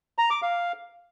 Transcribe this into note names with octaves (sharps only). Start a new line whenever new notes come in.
A#5
D6
F5